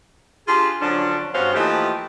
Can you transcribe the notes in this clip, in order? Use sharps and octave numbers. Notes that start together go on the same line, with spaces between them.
D4 F4 G4 G#4
D3 F3 F#3 C#4 D4
G2 B3 C#4 F#4 C5 F5
E3 F3 A3 A#3 D#4 G4